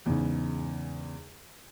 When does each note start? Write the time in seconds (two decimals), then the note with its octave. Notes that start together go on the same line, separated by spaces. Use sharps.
0.06 E2 G#2 C#3